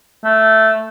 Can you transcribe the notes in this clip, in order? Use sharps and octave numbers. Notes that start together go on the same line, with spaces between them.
A3